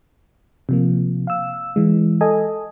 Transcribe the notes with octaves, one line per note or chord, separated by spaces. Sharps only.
C3 F3 A#3
F5 E6
E3 G#3
A4 D#5 G#5